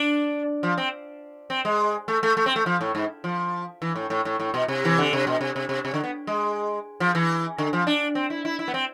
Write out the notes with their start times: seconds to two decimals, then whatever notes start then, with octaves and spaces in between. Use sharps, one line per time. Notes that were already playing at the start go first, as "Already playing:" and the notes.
Already playing: D4
0.63 F3
0.78 C4
1.50 C4
1.65 G#3
2.08 A3
2.23 A3
2.37 A3
2.46 C4
2.56 A3
2.66 F3
2.81 A2
2.95 G#2
3.24 F3
3.82 E3
3.96 A2
4.10 A2
4.25 A2
4.40 A2
4.54 B2
4.68 C3
4.85 E3
4.98 D3
5.13 C3
5.27 B2
5.41 C3
5.56 C3
5.69 C3
5.85 C3
5.94 D3
6.03 B3
6.27 G#3
7.00 F3
7.15 E3
7.58 D3
7.73 F3
7.87 D4
8.15 C4
8.30 E4
8.45 E4
8.59 E4
8.68 B3
8.74 C4